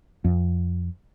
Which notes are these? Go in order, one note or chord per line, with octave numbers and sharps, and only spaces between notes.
F2